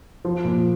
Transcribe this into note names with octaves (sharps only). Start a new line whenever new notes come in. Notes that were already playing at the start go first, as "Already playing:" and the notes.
F3
A#2